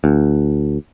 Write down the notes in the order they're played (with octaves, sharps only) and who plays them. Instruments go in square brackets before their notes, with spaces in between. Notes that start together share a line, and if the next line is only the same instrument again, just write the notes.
[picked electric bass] D2